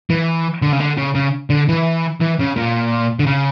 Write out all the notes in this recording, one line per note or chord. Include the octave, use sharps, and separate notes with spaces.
E3
D3
C#3
D3
C#3
C#3
D3
E3
E3
C#3
A#2
D3
C#3